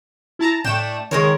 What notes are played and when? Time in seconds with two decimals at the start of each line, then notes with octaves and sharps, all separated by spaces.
0.39 E4 A5 A#5
0.64 A2 A3 D4 G5 E7
1.11 D#3 G#3 A#4 C#5